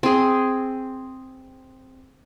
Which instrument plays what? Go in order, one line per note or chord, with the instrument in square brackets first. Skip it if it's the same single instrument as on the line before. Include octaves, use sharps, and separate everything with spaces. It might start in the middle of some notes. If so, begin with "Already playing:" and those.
[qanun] C4 G#4